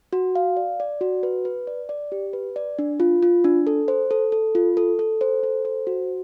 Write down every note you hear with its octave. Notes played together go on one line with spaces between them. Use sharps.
F#4
F5
D5
D5
F#4
B4
B4
D5
D5
G4
B4
D5
D4
F4
F4
D4
A4
C5
A4
A4
F4
A4
A4
C5
A4
C5
F#4